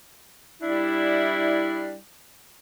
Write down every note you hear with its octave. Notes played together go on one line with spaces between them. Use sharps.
G3 D4 E4